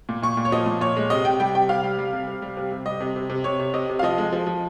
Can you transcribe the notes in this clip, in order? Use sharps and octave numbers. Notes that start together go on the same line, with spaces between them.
A#2
A#2 C#6
A#2
C#5
F3 D#5
A#2
A#2 C#5
G#3
C3 D#5
C3 G5
G3 G5
C3 G5
C3 F5
G3
G3
C3
C3
G3
C3
C3
G3 D#5
C3
C3
C3
C3 C#5
C3
C3 D#5
C3
F5
F3 D#5
G#3
F3
F3